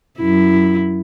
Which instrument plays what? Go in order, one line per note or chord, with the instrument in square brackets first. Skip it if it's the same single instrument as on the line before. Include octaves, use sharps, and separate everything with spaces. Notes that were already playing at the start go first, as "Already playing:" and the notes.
[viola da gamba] F#2 E4